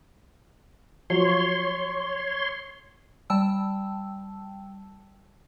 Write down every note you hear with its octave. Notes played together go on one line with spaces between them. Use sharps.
F3 F#3 C#5 C6
G3 G5 A5 E6